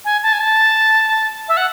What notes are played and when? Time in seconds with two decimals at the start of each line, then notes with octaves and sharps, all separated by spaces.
0.05 G#5
0.23 A5
0.33 G#5
0.40 A5
1.48 E5
1.57 F#5